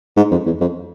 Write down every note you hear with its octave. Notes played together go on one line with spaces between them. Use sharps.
G#2
F2
E2
F2